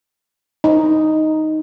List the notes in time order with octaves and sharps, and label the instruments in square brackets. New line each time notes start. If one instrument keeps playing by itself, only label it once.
[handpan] D#4